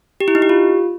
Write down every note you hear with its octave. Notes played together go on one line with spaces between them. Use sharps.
G4
E4
D#4
G4
F4